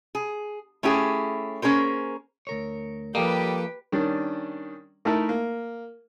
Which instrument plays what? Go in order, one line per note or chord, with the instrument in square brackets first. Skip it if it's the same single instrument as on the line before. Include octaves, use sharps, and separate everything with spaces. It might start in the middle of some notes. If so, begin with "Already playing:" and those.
[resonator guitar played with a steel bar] G#4
A3 C#4 E4 G4 G#4
A#3 C#4 G#4 A#4 C5
[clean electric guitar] D2 A#4 C#5
[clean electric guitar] F3 A4 D#5 [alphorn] G3 [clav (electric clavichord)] A#3 [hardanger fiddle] G4 B4
[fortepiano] D#3 G3 C#4 D4
A3 D#4 E4 A#4 E5 A5
A#3